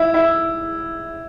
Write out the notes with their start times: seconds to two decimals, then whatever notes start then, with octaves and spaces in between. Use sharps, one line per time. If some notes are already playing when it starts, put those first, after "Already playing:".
Already playing: E4
0.14 E4